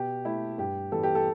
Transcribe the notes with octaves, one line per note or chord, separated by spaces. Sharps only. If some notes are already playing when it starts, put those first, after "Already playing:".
Already playing: B2 G4
A3 E4
G2 G4
E3 G3 B3 A4
G4
A4